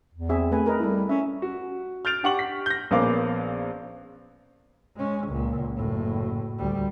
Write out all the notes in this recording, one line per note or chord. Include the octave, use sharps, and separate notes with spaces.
E2
C4 G#4 E5
A3 B4 G#5
A#4 B4 D#5
G3 E4 A4
C#4 E5
F#4
F6 G6 A6 D7 F7
D4 G4 F#5 C#6 F#7
B6
G6 A#6
A#1 A#3 B3 C#4 F5 D6
G#3 C#4
C#2 A#2
F#1 A2
D2 G3